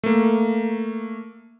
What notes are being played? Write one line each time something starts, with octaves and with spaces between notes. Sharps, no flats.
A3 A#3